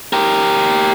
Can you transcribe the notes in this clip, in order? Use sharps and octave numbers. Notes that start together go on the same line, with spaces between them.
G4 A#4